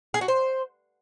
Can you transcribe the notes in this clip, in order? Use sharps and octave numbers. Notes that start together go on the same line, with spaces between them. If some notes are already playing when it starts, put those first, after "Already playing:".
G#4
F#4
C5